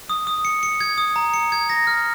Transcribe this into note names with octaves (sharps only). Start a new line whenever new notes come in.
D#6
D#6
C#7
C#7
G#6
D#6
A#5
C#7
G#6
A#6
F6